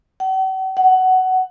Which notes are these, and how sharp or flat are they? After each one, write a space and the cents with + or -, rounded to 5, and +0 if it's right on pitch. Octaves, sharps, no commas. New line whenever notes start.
F#5 +45
F#5 +15